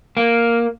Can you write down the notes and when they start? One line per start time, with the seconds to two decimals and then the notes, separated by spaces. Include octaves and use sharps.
0.17 A#3